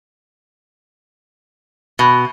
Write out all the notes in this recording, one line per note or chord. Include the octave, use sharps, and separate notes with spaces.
B2